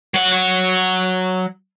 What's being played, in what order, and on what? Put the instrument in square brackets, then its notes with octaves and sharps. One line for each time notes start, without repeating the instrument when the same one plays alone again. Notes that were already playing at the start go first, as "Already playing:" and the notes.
[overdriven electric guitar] F#3 F#5